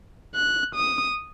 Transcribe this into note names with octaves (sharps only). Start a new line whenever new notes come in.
F#6
D#6